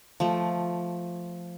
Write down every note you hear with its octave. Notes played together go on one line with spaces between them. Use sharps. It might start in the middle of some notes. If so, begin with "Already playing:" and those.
F3 A3